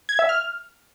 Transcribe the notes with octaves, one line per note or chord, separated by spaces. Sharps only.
G#6
E5
F6